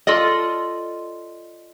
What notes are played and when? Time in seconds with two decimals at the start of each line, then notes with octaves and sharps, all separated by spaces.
0.07 F4 A4 D5 D#5